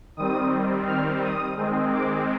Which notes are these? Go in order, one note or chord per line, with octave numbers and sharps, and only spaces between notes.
D#3 G3 C4 D#6
F6
D#6
D#3 G#3 C4
D6